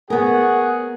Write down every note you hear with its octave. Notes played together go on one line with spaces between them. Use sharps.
B3 G#4 A#4 C#5 F#5